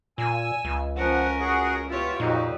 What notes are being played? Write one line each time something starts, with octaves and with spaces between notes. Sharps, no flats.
A#2 G#5 E6
C#2
F3 C#4 A#4 F#5
F#4 G#4 F#5
B2 E4 F4 G4 C#5
F2 A#2 D#4 F#4 G4